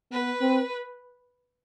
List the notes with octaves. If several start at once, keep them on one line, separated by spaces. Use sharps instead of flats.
B3 B4
C4